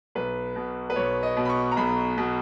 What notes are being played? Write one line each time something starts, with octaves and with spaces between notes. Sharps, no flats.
B1 B4
B2
B4
B1 C#5
D#5
B2
B5
C#6
A#5
B1 B5
B2